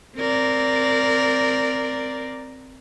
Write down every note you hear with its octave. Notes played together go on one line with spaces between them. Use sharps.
C4 A#4 D5